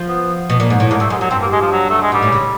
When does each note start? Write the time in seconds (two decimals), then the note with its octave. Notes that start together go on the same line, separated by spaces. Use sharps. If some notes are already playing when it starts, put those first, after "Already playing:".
Already playing: F3
0.08 B3
0.50 B2
0.60 A#2
0.70 G#2
0.80 A2
0.90 G#2 A#3
1.00 G2 A3
1.10 F#2 G#3
1.21 F#2 F#3
1.31 G2 C4
1.41 A#3
1.52 G#3
1.61 F3
1.72 F#3
1.89 A3
2.01 G#3
2.12 G#2 G3
2.22 A2
2.32 C#3